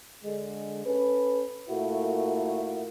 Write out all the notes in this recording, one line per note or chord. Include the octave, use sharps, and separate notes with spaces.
D3 G#3
C#4 A4 B4
A#2 A3 A#3 E4 F#4